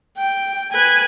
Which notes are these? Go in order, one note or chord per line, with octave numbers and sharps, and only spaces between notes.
G5
B4 G#5